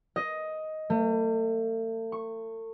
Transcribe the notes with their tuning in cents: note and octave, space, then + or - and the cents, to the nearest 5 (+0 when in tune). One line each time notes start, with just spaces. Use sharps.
D#5 +10
A3 +40
C#6 -10